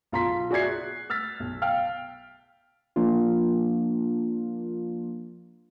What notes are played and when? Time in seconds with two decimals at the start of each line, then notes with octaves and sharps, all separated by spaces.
0.12 B1 F4 A#5 C6 B6
0.51 F#4 G#4 D5 E5 G#6 C7
0.62 F#6
1.10 E6 F6 A6 B6
1.40 B1
1.62 F5 G5 F6
2.96 F3 A#3 D4 F4